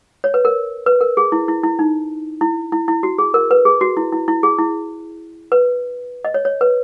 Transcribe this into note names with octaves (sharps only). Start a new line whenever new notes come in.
C#5
B4
A#4
B4
A#4
G#4
E4
E4
E4
D#4
E4
E4
E4
F#4
G#4
A#4
B4
G#4
F#4
E4
E4
E4
G#4
E4
B4
D#5
C#5
C#5
B4